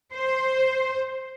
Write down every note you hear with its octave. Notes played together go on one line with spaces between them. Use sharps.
C5